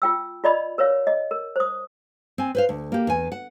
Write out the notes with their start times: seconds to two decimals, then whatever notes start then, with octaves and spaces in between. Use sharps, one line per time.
0.02 F4 G5 E6
0.44 F4 D5 D#5 B5
0.78 A#4 B4 C#5 F5
1.07 D#5
1.31 A#4
1.56 C5 D#6
2.38 C4 G#5
2.55 B4 C5 F5
2.69 D2
2.92 A#3 G4
3.07 E2 G#5
3.32 F#5